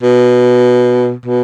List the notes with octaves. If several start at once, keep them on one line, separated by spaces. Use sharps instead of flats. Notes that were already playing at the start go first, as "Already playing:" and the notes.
B2
B2